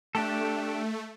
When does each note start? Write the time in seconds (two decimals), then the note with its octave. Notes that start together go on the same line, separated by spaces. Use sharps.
0.15 A3 D4 G4 A4